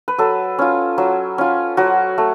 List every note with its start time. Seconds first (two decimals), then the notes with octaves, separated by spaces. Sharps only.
0.08 B4
0.18 F#3 A4
0.59 C#4 F4
0.98 F#3
1.38 C#4 F4
1.77 F#3 F#4
2.18 A3